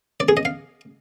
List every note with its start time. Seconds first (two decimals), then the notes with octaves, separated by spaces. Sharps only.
0.20 D5
0.29 G#4
0.37 D#5
0.45 F5